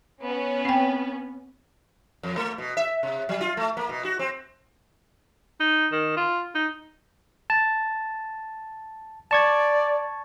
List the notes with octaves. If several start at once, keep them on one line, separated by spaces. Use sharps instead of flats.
B3 C#4
C4 G5
F2
A3
B2
E5
C3
F#3
F4
A3
A#3
B2
F#4
C4
D#4
D#3
F4
D#4
A5
D5 A5 C#6 G#6